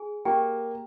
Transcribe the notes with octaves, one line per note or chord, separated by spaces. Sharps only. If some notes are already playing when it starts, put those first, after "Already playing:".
Already playing: G#4 G#5
A#3 G4 G5